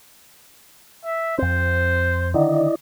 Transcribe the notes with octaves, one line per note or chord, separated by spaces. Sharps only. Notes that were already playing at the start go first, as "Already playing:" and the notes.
E5
F2 C4 C5
D3 D#3 E4 D5 D#5